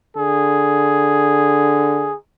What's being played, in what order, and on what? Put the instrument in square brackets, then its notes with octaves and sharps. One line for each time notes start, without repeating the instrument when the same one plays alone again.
[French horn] D3 [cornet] G#4